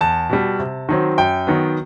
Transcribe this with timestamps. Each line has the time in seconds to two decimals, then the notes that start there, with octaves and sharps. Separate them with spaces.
0.01 E2 A5
0.29 B2 G3
0.59 C3
0.89 D#3 F#3 C4
1.18 F#2 G5
1.47 D#3 F#3 B3